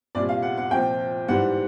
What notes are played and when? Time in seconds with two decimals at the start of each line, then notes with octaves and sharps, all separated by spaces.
0.15 C2 A#2 G3 D5
0.29 F5
0.42 F#5
0.57 F#5
0.71 C2 A#2 F3 G5
1.28 G#2 E3 G3 F#5